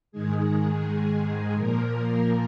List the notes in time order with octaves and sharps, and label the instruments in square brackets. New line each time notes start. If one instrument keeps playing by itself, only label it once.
[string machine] G#2 D#3 G#3 G#4
A#2 F3 A#3 A#4